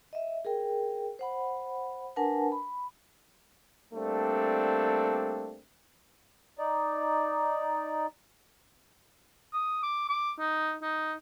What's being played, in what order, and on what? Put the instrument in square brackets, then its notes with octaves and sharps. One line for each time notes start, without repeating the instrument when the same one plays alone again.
[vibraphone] D#5 E5
G#4 A#4 G5
C5 F#5 B5
D4 A#4 B4 F#5 G#5 A5
B5
[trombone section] G3 A3 A#3 C4 D4 A4
[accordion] D#4 D5
[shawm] D#6
D6
D6
D#4
D#4